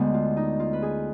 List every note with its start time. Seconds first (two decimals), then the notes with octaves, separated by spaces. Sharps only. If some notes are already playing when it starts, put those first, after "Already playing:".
Already playing: D2 D3 G#3 B3 C5
0.14 F4
0.37 D#4
0.60 F4
0.73 B4
0.82 G#4